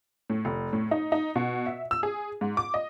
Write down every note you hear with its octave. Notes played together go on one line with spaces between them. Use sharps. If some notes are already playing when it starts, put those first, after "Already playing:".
A2
F1
A2
D#4
D#4
B2
E5
E6
G#4
G#2
D6
D#5